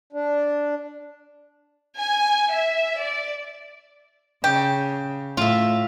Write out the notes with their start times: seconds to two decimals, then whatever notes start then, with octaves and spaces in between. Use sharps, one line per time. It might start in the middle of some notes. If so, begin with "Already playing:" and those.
0.13 D4
1.98 G#5
2.52 E5
3.02 D5
4.44 C#3 G4
5.37 A2 F4 E5